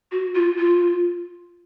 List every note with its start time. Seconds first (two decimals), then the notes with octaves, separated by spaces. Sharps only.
0.12 F#4
0.35 F4
0.59 F4